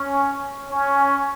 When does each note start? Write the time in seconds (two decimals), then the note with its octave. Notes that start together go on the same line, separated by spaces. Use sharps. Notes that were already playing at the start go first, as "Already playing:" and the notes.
Already playing: C#4
0.71 C#4